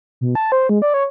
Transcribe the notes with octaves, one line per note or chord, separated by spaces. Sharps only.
B2
A5
C5
G#3
D5
C#5